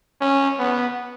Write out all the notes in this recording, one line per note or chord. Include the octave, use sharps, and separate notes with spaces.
C#4
B3